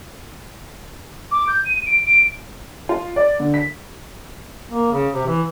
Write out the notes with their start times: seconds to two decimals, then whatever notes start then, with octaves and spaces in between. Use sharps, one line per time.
1.31 D6
1.48 G6
1.65 D#7
1.86 D7
2.06 D7
2.89 F4
3.16 D5
3.40 D3
3.54 B6
4.71 A#3
4.92 C#3
5.14 C3
5.27 E3